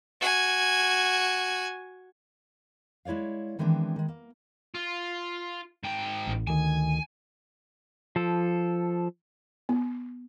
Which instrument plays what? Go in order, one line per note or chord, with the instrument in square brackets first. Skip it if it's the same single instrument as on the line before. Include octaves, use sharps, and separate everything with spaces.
[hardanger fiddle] F#4 G#5
[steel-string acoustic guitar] G#3 E4 C#5 D5 F5
D#3 E3 G#3 B3 C4 D4
D#3 G#3
A#3
[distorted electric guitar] F4
G#2 G5
[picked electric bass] A1
[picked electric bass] D2 D#3 [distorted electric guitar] G#5
[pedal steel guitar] F3 A4
[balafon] B3